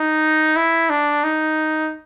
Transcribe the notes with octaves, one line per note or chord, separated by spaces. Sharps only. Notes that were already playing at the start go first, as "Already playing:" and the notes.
Already playing: D#4
E4
D4
D#4